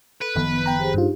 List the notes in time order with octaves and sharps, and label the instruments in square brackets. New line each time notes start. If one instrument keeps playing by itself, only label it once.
[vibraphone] A4 [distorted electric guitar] B4
[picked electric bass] F#1 D#3 F3 [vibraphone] B3
[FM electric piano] G5 A#5
[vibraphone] G4 G#4 C5
[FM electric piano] G2 F4 [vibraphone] D4 D#4 G4